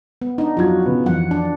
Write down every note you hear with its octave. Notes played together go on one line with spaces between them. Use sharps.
B3
D4 D#4
F2 F#3 F4 F#4 G#6
C#3 B3
F2 E3 F#5
D4